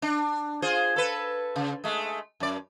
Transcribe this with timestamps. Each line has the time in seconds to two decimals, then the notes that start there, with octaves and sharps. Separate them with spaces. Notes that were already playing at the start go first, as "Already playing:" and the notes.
0.02 D4
0.62 F4 G#4 C5
0.96 A4 B4
1.56 C#3
1.84 G#3 A3
2.40 F#2 D5